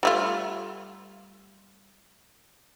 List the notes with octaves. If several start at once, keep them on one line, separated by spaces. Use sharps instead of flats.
G3 A3 F4